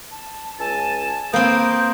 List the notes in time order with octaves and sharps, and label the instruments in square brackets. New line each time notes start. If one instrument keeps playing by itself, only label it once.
[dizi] A5
[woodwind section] C#2 A5 [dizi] G#5
[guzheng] A#3 C4 [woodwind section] B4 D#6 [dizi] G6